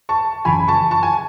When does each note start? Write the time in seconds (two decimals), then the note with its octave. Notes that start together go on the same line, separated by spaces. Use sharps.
0.09 A5 C#6
0.45 F#2 C#3 E3 G#5 B5
0.68 A5 C#6
0.91 A5 C#6
1.03 G#5